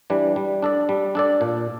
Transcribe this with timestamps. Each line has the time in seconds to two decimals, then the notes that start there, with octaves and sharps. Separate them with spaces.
0.10 E3 G3 D4
0.36 G3
0.62 D4 A4 D5
0.89 G3
1.15 D4 A4 D5
1.41 A#2